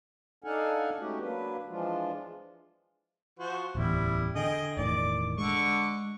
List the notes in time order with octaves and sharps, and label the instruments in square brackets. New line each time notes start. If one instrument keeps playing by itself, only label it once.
[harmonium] D4 D#4 A4 F5 F#5 G#5
G#3 A3 C#4 D#4 F#4 G4
F#3 A#3 D4 B4
E3 F3 G#3 D4 F4
[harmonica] F3 F#4 C5
[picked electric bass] D1 A1 E2 [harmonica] G3 E4
[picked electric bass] D3 [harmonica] G#4 D#5 G5
[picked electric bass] E1 A2 D#3 [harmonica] D5 D6
[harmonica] D3 C#6 [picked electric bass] G#3